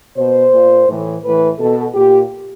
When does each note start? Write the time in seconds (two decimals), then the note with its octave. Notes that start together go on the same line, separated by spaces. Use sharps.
0.17 B2 C5
0.53 A#2
0.87 A2 E3
1.23 A2 E3 B4
1.58 B2 A4
1.94 A#2 G4